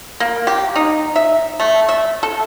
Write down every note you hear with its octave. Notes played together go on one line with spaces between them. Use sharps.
A#3
G4
D#4
E5
A3
E5
A4